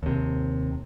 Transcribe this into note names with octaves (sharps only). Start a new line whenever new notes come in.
D#2 C3